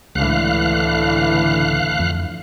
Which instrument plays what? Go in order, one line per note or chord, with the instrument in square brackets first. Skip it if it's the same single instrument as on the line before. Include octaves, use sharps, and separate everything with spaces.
[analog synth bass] C#2 [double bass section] A2 D3 E3 [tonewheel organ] F5 F#6
[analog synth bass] F2